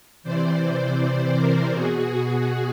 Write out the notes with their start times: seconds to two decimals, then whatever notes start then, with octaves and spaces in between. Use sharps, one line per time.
0.23 C3 E3 C5 D5
1.34 A#4 C5
1.71 B2 F#4 G#4